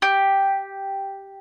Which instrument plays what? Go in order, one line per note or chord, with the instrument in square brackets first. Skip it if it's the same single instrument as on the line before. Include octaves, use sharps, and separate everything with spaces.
[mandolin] G4